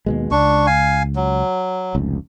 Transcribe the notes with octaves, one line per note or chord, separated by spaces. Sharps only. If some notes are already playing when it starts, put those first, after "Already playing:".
D#2 B2 G#3
C#2 D4 C#6
F5 G#5
F#3
F1 C#2